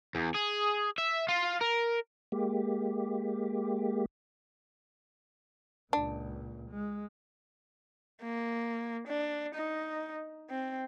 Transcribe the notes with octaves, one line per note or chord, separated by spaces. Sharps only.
E2
G#4
E5
F4
A#4
G#3 A#3 G4
C#2 A#2 D4
G#3
A#3
D4
D#4
C4